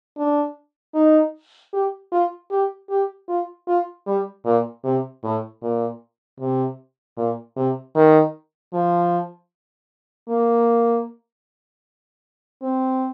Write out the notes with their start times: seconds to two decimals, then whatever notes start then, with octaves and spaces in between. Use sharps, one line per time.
0.18 D4
0.95 D#4
1.73 G4
2.12 F4
2.51 G4
2.90 G4
3.28 F4
3.68 F4
4.07 G3
4.45 A#2
4.84 C3
5.24 A2
5.62 A#2
6.40 C3
7.17 A#2
7.56 C3
7.96 D#3
8.73 F3
10.29 A#3
12.62 C4